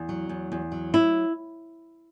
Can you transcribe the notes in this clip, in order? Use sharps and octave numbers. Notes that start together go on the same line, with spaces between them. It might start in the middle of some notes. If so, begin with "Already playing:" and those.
Already playing: E2
F#3
E2
E2
F#3
E4